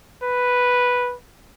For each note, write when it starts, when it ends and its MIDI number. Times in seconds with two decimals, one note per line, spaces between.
0.23 1.14 71